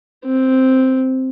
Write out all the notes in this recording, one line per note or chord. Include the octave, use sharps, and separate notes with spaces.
C4